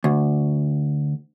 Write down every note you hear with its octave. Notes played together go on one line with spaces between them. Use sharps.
D2